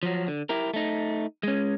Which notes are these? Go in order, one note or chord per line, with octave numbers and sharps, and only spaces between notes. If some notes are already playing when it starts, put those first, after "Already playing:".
F3 F#3
D3
E4 G4 A#4
A3 D#4
G#3 C#4